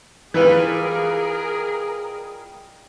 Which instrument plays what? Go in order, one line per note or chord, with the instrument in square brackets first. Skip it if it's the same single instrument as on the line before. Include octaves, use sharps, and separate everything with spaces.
[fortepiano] E3 B4 [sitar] G3 G#3 F4 [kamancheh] G#4 A#4